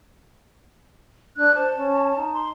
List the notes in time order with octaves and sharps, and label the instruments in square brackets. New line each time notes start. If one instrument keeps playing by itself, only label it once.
[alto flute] D4 [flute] F#6
[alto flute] C5 [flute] A5
[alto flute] C#4
D#4
[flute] C6